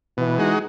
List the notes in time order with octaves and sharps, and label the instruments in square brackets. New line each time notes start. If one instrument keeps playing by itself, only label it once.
[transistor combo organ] B2 [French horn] E3
[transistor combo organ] G#3 D#4 F#4